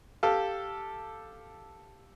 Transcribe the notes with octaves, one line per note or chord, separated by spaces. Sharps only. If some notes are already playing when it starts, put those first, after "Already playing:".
G4 A4 F5